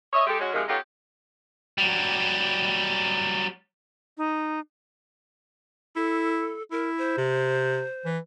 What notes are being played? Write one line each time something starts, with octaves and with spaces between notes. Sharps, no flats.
C#5 D#5 E5
G#3 G4 A4
G#3 C#4 F#4
C3 D#3 F3 G#3
B3 D#4 F4 G4 A4 C#5
F#3 G3
D#4
E4 A4
E4 A#4
C5
C3
E3